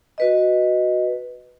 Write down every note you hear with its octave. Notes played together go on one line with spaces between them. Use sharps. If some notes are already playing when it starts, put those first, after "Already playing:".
F#4 B4 D#5